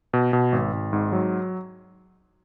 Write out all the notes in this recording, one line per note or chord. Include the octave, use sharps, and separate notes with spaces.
B2
B2
G#1
G#1
G#2
F#3